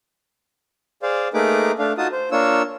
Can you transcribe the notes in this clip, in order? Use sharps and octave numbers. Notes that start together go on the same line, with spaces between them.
G#4 C5 D5 F5
A3 A#3 D#4 G#4 B4 D6
A3 D4 F5
D#4 F4 F#4 A5 D#6
C5
A#3 D4 F4 C#5 E6